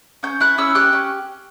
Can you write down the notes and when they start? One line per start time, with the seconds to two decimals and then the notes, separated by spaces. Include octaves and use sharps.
0.23 C#4 G6
0.40 E4 F#6
0.58 C#4 E6
0.75 G4 F#6
0.93 C#4